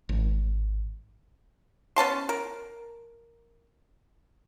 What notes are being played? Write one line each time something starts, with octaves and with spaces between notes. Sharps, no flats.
G#1
B3 C#4 A5 C6
A#4